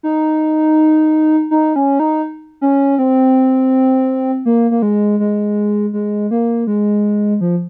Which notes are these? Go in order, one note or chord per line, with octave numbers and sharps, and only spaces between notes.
D#4
D#4
C#4
D#4
C#4
C4
A#3
A#3
G#3
G#3
G#3
A#3
G#3
F3